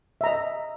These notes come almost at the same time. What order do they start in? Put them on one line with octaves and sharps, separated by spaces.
E5 A#5 D#5